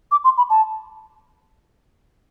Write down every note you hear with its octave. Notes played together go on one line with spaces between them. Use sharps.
D6
C6
B5
A5